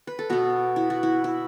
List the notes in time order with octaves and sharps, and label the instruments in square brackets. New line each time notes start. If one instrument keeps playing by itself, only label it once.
[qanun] B4
A4
B2 B3 F#4
E4
F#4
E4
E4